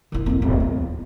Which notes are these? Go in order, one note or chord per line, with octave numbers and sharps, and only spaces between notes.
D#3 E4
F2 A#3
D1
E2